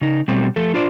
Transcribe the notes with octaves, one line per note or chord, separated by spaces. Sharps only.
C#3 D#4
B2 F#3 G3 A3 C4
F3 A3 A4
D4 F4 C5 D5